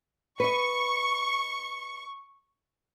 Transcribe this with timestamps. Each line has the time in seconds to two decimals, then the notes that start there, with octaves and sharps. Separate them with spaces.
0.40 B4 D#5 C#6